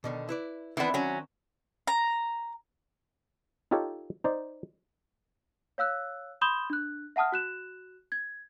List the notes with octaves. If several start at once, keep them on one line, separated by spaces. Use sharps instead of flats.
B2 D3 D#3
E4 B4 D5
D#3 E3 B3 C4 D4
F#3 C#4
A#5
D#4 F4 G4 A4 C#5
D#4 C5 D5
C#5 F5 E6 F#6
B5 C6 D#6 G6 E7 G7
D4 F#6
E5 F#5 A5 D#6 F6
F#4 F#6 E7
G#6